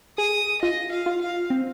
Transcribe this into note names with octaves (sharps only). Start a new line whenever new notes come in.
G#4 D#6
F4 D#5
F5
F4
F5
C4